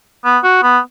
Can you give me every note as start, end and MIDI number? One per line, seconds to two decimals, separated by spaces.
0.25 0.39 59
0.44 0.63 66
0.63 0.79 59